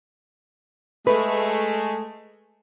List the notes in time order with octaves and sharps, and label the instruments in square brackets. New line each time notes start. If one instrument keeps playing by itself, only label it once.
[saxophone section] G#3 A3 [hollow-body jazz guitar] B4